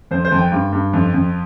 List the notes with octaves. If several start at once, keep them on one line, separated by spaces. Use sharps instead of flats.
F2 C5
C5
F2
G5
G2
G2
F2
F2